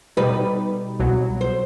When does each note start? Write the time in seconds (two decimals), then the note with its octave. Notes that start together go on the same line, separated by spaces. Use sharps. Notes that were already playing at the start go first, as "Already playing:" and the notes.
0.17 B2 G3 D#4 B4
0.99 C2 B2 F#3
1.41 C5